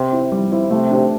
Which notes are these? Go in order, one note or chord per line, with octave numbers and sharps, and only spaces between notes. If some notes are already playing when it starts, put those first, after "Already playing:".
Already playing: C3
C4 E4
G3
C4 E4
C3 A3
D4 G4 C5